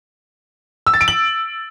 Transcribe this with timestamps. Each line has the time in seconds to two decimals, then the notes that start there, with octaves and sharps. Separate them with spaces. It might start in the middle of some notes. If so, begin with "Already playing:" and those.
0.87 E6
0.94 A6
1.01 D7
1.08 F#7